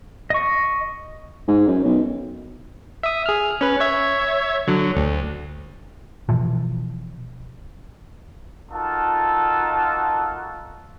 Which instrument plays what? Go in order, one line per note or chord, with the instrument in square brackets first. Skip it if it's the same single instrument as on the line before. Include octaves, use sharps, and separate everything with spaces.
[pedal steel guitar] D#5 C#6
[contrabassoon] G#2
F#2
B1
[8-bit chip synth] E5 D#6
G#4 F6
C#4 B4
C#5 E5 G#6
D3 F#3
D2
[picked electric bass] B2 E3 F3
[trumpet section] D#4 F4 F#4 A4 A#4 A5